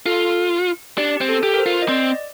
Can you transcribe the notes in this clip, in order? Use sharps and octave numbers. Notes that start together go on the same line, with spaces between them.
F4 A4
D4 G4
C4 G4
A4
G4
A#4
C5
F4
D#5
C4 D5